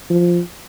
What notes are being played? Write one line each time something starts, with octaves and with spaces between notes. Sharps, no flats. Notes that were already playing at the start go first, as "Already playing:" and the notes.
F3